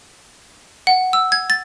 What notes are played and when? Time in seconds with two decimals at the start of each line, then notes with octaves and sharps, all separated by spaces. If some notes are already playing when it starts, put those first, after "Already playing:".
0.87 F#5
1.13 E6
1.32 G#6
1.50 A6